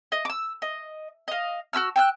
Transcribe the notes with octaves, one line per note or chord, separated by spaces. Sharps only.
D#5
D6 E6
D#5
D#5 F5
F#4 G4 E6 F6
G5 E6 F#6